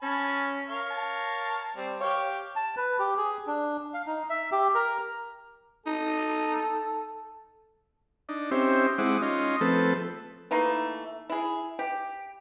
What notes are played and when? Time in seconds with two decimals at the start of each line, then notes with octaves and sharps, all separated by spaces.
0.02 C#4 G#5 A5 B5
0.69 A#4 C#5 F5
0.91 A5
1.77 G3 C4
2.01 G4 C#5 F5
2.56 A5
2.77 B4
2.99 G4
3.18 G#4
3.47 D4
3.94 F5
4.06 D#4
4.30 E5
4.52 G4
4.75 A#4
5.86 D#4 A4
8.29 D4 D#4
8.51 C4 C#4 D#4 G4 C5 E5
8.98 G#3 C4 E4 F#5 D6 D#6
9.22 C#4 D#4 F4 D#5 C6
9.61 F3 A3 C4 A4 B4
10.51 E3 A3 A#3 D#4
11.30 E4 G#4
11.79 G4